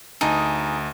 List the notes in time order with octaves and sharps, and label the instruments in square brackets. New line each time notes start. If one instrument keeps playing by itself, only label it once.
[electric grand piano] D2 D#5 A5 [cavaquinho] D#4 G#4